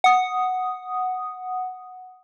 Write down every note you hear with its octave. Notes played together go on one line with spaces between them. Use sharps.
F#5 D#6